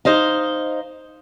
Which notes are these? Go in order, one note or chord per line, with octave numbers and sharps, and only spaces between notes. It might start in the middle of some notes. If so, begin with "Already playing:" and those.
D#4 C5 D#5 F5